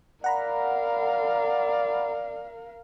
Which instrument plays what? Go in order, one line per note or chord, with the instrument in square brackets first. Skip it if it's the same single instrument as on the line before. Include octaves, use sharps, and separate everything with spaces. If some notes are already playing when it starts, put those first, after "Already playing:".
[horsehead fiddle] A#4 F5 [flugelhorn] D5 [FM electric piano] F#5 A#5 B5